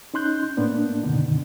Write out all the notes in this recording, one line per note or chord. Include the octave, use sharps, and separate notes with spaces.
C#4 D#4 C6 F#6 G6
A2 A#3 B3 D4
F#2 B2 D3 D#3